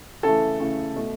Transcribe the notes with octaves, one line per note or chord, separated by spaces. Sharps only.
C#3 E3 A3 A4
C#3 E3 A3
B2 A3